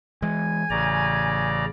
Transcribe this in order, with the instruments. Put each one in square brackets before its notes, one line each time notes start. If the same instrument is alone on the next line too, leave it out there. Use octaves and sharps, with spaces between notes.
[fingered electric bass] E3 G#3 [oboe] G#5
[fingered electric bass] A1 [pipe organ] C#3 D5 A#5